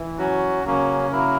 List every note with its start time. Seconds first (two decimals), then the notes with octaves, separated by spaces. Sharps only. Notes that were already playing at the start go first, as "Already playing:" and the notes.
Already playing: E3
0.17 F#3 C#4 F#4
0.65 C#3 F#3 A#3 C#4
1.12 F#3 A#3 E4 A#4